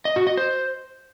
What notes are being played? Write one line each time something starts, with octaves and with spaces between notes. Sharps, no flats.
D#5
F#4
D#5
C5